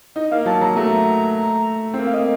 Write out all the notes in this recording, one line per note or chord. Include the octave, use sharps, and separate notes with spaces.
D#4 D#5
A#3 F5
F#3 A5
F#3 A#5
A3 A#5
C4
A#3
F5
A#3 D#5